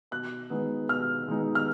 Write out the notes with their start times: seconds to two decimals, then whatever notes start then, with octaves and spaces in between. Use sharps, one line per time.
0.11 B2 F#6
0.50 G#3 B3 D#4
0.89 B2 F6
1.28 G#3 B3 D#4
1.55 F6